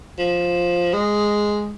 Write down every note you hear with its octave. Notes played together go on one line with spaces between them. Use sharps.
F3
G#3